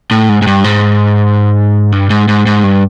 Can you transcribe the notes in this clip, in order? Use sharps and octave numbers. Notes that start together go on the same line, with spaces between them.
A2
G#2
G#2
G2
G#2
G2
G#2
G#2
G#2
G2